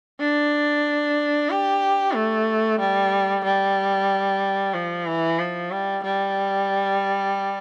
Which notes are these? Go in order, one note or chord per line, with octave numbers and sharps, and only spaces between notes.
D4
G4
A3
G3
G3
F3
E3
F3
G3
G3